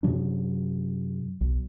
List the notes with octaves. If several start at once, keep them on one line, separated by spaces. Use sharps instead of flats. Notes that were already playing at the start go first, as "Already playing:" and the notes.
F#2 C3 F#3 D4
B1